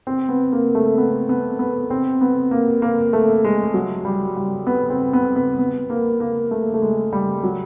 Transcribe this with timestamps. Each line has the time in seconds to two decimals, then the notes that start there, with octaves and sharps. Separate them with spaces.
0.07 C4
0.29 B3
0.52 A#3
0.75 A3
0.98 B3
1.29 B3
1.59 B3
1.90 C4
2.21 B3
2.51 A#3
2.82 A#3
3.13 A3
3.45 G#3
3.74 F#3
4.05 G3
4.36 G3
4.67 B3
4.90 C4
5.13 B3
5.36 B3
5.59 B3
5.90 A#3
6.20 A#3
6.51 A3
6.74 A3
6.82 G#3
7.13 G3
7.44 F#3